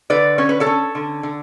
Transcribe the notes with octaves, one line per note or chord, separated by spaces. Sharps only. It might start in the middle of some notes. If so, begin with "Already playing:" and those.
D3 B4 D5
C#4 C#5
B4
A4 C#5
C#4
D3
D3